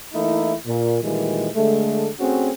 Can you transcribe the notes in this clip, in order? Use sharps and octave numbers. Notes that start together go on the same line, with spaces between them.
E3 A3 A#3 D#4 E4
A#2
A#2 D#3 E3 G3 G#3
D3 G#3 A3
A3 C4 C#4 F#4 G#4